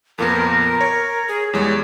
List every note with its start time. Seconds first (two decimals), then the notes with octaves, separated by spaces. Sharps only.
0.18 F2 A#2 B3 A#4
0.81 C#5
1.28 G#4
1.53 E2 G3 G#3 C#5